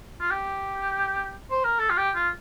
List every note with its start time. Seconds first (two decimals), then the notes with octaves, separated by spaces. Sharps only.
0.21 F4
0.31 G4
1.51 C5
1.64 A#4
1.79 A4
1.90 F4
1.97 G4
2.15 F4